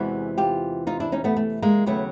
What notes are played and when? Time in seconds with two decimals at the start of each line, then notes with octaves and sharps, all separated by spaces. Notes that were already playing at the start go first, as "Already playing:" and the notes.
Already playing: E2 C3 E3 G#3 E4 F#4
0.38 F4 G4
0.87 D#4 F4
1.00 D4 E4
1.12 C#4 D#4
1.24 A3 B3
1.37 A3
1.62 G#3 A#3
1.86 D#2 C#3 F#3 A3 B3